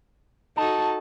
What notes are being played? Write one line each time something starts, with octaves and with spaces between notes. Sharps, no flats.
D#4 F#4 A4 A5